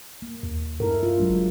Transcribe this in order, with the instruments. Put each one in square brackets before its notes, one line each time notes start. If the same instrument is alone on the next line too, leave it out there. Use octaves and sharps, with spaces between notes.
[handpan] A#3
[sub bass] D#2
[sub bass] G2 [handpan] E4 A4 A#4
[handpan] F4
F#3 G#3 D4
[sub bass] F#1